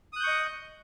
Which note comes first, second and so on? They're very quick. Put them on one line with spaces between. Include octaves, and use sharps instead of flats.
D#6 F#6 G6 C#6 D#5